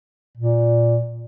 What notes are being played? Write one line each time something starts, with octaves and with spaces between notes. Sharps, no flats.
A#2